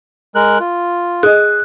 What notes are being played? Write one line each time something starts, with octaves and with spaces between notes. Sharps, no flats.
G#3 A#4 F#6
F4
G#4 D#5 F#6